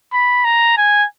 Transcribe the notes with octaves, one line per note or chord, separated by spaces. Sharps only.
B5
A#5
G#5